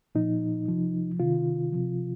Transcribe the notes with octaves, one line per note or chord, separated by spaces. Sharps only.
A#2 F3 D#4
C3 F3
C3 D#3 F4
C3 F3